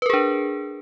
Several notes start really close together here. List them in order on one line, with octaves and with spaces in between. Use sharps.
B4 A#4 G#4 D4